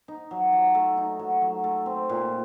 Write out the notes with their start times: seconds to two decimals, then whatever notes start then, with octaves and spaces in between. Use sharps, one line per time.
0.08 D#4
0.31 F#3
0.53 F#3
0.75 A3
0.97 D#4
1.19 F#3
1.42 F#3
1.64 A3
1.86 C4
2.09 A#2